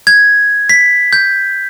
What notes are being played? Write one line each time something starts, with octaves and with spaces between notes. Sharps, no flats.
G#6
B6
G6